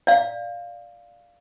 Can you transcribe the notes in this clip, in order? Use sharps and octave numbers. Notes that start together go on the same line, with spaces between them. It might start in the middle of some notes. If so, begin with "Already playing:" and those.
D5 F5